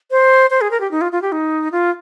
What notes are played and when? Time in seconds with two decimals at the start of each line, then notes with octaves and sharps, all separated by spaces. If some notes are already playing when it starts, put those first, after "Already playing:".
0.11 C5
0.50 C5
0.61 G#4
0.71 A#4
0.81 G4
0.91 D#4
1.01 F4
1.12 F4
1.22 G4
1.32 D#4
1.72 F4